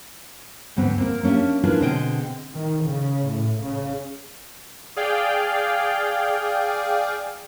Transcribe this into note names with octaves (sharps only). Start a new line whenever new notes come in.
D2 G#2 B3 C4
A#3 C4 A#4
A#3 C#4 D4 G4 E5
D4 E4 F4 G#4 A#4 B4
B2 D3 C4 G#4 D#5 G5
D#3
C#3
A2
C#3
G#4 D5 F5 G5